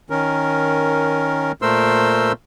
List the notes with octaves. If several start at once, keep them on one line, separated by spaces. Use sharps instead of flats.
D#3 C#4 A#4
A#2 A3 A#4 C5 C6 E6